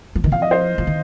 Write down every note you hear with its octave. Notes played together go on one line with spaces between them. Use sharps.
F3
D#3
F3 F5
D#5
C5
F3
D#3